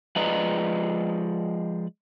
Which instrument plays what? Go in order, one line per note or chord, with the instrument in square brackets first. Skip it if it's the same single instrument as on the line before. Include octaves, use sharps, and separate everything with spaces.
[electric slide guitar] F3 G#3 B4 D5 D#5 A#5